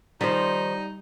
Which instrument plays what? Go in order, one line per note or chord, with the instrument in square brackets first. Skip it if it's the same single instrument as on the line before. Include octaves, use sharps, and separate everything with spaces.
[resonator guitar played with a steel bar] D#3 F3 C5 [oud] G3 [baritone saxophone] D#4